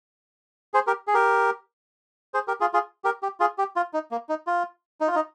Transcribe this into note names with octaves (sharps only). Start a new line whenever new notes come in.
G#4 C5
G4 A#4
G#4
G4 A#4
G#4 C5
G4 A#4
F4 G#4
F4 G#4
G4 A#4
G4
F4 G#4
G4
F4
D#4
A#3
D#4
F4
D#4
F4
D#4